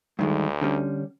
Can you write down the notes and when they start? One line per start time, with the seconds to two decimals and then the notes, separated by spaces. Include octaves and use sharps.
0.19 D2 G2 D#3 G#3
0.61 D3 G3 C#4